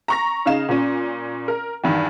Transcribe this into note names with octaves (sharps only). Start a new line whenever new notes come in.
A#5 C#6 A#6
C#3 D#4 F5 E7
A#2 C#4
A#4
E2 G2 D#3